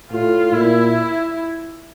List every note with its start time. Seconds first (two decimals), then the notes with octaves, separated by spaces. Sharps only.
0.11 A2 F4
0.52 A#2 E4